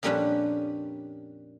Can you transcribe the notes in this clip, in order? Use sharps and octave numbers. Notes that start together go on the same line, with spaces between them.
F2 A#2 G3 C#4 D4 B4